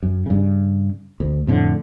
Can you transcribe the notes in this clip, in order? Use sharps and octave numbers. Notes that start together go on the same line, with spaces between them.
F#2
G2 C#3
D2
F2 A2 D3